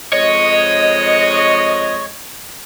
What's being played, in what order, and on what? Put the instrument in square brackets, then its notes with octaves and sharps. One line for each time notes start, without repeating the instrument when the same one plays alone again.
[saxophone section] F2 G#3 D#5 [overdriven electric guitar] C#5